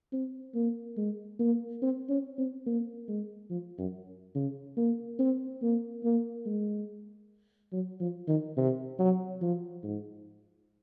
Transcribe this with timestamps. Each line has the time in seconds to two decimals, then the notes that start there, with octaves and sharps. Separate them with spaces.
0.13 C4
0.55 A#3
0.97 G#3
1.40 A#3
1.82 C4
2.09 C#4
2.38 C4
2.67 A#3
3.08 G#3
3.50 F3
3.78 F#2
4.35 C#3
4.77 A#3
5.19 C4
5.62 A#3
6.04 A#3
6.46 G#3
7.72 F#3
8.01 F3
8.28 D#3
8.57 C3
8.99 F#3
9.42 F3
9.84 G#2